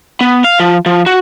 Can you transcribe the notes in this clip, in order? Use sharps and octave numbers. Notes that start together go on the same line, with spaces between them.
B3
F5
F3
F3
F#4